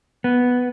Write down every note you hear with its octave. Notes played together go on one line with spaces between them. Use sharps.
B3